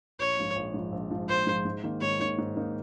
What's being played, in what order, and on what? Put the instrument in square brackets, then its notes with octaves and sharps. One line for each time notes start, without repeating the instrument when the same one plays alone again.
[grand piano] A#1 [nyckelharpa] C#5
[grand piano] G#2 F3
A#1
G#2 F3
A#1
G#2 F3
[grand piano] A#1 [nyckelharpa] C5
[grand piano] G#2 F3
G#2
D#3 A#3 D#4
[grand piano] G#2 [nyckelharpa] C#5
[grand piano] D#3 A#3 D#4
G#2
D#3 A#3 D#4